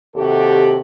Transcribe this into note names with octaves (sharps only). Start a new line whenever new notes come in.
D#2 C3 F#4 G4 A4